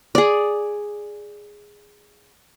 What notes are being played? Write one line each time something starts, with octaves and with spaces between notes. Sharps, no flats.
G#4 D5